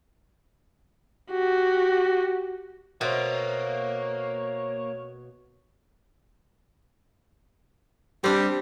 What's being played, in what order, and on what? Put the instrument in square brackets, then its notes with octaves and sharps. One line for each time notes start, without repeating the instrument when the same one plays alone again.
[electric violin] F#4 G4
[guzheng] B2 [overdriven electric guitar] A#3 [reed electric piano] C5 E5 [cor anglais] C#5
[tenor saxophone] G3 [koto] C4 D4